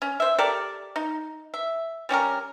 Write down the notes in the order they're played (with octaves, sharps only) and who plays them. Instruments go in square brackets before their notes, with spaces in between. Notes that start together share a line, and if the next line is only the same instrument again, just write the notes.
[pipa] C#4
C5 E5
G4 A4 A#4 D5
D#4
E5
G3 C#4 G4 A#4